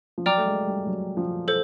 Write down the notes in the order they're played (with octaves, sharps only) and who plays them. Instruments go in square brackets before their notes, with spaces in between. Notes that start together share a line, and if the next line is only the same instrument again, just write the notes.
[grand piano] F3
[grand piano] F#3 [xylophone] D5 G5 A#5 D6 F6
[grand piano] A3
G#3
G3
F#3
F3
[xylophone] A4 C5